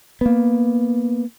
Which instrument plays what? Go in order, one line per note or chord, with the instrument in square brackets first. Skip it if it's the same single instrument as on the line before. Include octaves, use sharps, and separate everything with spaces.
[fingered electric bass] A#3 B3